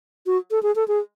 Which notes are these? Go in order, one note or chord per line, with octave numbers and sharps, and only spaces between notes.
F#4
A4
G#4
A4
G#4